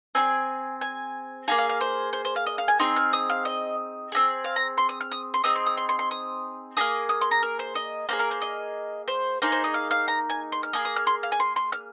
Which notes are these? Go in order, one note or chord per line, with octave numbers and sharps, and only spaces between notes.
C4 D#4 G#4 G#5
G#5
A#3 D#4 G#4 F5
F5
F5
C5
C5
C5
F5
D#5
F5
G#5
C4 D#4 G#4 C6
F6
D#6
F5
D#5
C4 D#4 G#4
F5
A#5
C6
D#6
F6
D#6
C6
C4 D#4 G#4 D#6
C6
D#6
C6
C6
C6
D#6
A#3 D#4 G#4 D#6
D#6
C6
A#5
A#4
C5
D#5
A#3 D#4 G#4 C5
A#4
C5
D#5
C5
A#3 D#4 G#4 C5
C5
D#5
F5
F5
A#5
G#5
C6
F6
A#3 G#4 D#6
D#6
F6
C6
F5
G#5
C6
C6
F6